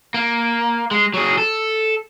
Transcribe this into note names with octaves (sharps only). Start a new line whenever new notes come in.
A#3
G#3
F#3 G#4
A4